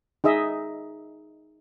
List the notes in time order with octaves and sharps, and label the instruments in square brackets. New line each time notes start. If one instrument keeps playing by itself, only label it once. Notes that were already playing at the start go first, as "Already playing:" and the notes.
[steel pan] D#4 G#4 D#5 E5